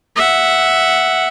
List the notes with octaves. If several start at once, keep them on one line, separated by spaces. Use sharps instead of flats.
E5 F#5